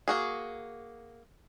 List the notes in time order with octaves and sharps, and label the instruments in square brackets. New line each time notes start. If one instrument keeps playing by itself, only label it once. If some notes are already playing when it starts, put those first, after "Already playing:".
[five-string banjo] A#3 F#4 G#4